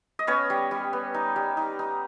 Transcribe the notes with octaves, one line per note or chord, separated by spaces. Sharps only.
D#5
B3 C#4 C#5
G3
G3
B3
D#4
G3
D#4
D#4